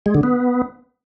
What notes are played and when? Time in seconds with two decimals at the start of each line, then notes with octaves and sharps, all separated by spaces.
0.06 G#3
0.15 D3
0.23 B3